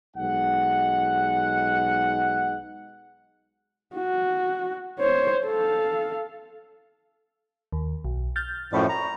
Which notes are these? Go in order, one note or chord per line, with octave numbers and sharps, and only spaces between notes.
B1 G#3 D#4 F#5
F#4
C5 C#5
A4 F5
D#2
B1
F6 G6 A6
F#2 A2 F3 D5 B5 C#6
A#5